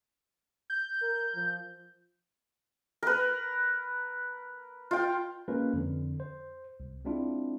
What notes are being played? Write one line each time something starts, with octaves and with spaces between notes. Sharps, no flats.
G6
A#4
F3
A#4 B4
F4 G5
G#3 A#3 C#4 F4 A#4 B4
F2 D3
C5
C2
G#3 C4 D4 E4 F4